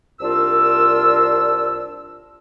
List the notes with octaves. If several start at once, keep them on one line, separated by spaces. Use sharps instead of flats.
C2 D4 F4 A#4 E6